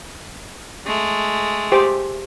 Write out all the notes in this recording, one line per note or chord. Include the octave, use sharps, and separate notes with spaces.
G#3 A3
G4 C5 D6